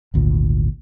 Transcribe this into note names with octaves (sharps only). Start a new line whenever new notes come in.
G#1 D2 A#2